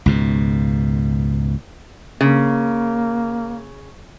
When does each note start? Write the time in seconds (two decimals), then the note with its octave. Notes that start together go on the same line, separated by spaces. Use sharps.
0.06 C#2 G#2 B2
2.21 C#3 A#3